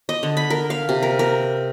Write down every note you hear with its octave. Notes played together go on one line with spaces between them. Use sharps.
D#5
D3
B5
A#4
F5
C3
A#4
A#4